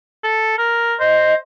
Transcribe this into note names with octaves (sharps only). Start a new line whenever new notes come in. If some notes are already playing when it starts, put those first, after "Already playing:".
A4
A#4
C5 D#5